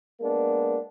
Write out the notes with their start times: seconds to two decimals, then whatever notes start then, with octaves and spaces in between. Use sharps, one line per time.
0.21 G#3 A#3 B3 D4